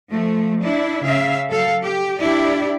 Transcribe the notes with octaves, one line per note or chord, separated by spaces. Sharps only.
F3 A3
D4 E4
C#3 E5 F5
F#3 A4 F5
G4
D4 E4 G4 D5